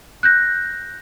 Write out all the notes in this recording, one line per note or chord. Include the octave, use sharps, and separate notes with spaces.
F#6 G6 A#6